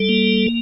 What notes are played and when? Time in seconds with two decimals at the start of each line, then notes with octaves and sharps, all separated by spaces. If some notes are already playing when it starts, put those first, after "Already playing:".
Already playing: G3 A4
0.09 A#3